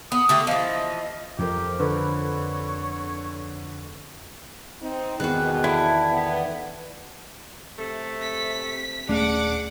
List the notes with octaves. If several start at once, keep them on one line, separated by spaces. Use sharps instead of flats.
B3 D#6
D3 A3 G4
E3 F3 D#5
F2 F3 G4 A#4
D3 B4 C#5
C4 D#4
E2 B2 D#3 F#4 G#4 B4
D3 E4
B3
C3 A3
B6
D#1 A3 C#4 D4 G#4 F#5 D6